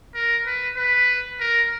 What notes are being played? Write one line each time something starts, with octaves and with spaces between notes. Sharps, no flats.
A#4
B4
B4
A#4